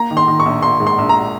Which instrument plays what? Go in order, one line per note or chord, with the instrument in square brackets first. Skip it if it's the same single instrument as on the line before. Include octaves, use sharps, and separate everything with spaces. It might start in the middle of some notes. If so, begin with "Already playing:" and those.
Already playing: [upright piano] A#3 A#5
D#3
C6
D#3
C#6
A#1
A#3 C6
G#2
C6
A#1
A#5